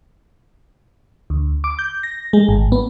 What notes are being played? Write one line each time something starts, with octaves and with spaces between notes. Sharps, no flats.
D2
D6
G6
A#6
G#3
G#1
B3